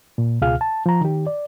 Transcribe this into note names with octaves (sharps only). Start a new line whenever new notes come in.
A#2
C#2 B2 F4 G#4 F5 F6
A5
F3 A#5
D#3 G4
D5